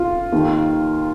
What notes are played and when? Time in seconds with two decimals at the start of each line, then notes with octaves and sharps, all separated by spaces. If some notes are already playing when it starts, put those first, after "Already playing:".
Already playing: F4
0.32 D#2 D#3